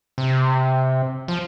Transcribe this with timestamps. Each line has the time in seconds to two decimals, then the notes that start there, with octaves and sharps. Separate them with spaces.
0.18 C3
1.28 F3